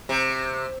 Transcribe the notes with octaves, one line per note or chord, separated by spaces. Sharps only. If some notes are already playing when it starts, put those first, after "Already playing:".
C3